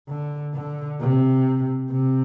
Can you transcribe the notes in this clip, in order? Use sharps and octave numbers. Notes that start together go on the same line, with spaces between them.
D3
D3
C3
C3